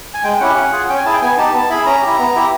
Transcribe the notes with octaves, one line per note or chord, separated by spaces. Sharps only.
G#5
G#3 G5
C#4 E4 G4 F#5
C#4
F4 G#4
C#4 G5
G#5
E4 G#4 A5
G5
B3 G#5
D#4 G4 A5
B3 A5
E4 G#4 B5
C#4 A#5
E4 G4
B3
E4 G4